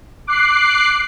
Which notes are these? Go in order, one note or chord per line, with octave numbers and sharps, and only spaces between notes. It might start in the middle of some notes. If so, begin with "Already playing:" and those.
D6 F#6 C7